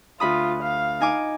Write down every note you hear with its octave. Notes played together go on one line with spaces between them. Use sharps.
D2 F4 B5 D#6
F5
D#4 G#5 D6